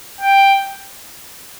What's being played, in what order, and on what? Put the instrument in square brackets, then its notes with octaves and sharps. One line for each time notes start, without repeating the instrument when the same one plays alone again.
[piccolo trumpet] G5